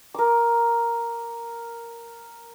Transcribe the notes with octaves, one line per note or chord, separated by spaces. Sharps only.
A#4 D6